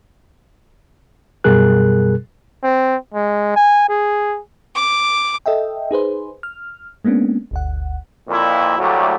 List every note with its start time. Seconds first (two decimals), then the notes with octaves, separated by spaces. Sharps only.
1.44 F#2 B2 G3 G#4 A#4 F#6
2.63 C4
3.14 G#3
3.56 G#5
3.89 G#4
4.75 D6
5.46 A4 D#5 E5 G5
5.91 D#4 G#4 B4 C5
6.43 F6
7.05 G#3 A#3 B3 C#4 D4
7.51 G1 D2 F#5
8.28 F2 A#2 E4
8.79 D2 A2 F#3 G3 A3 A#3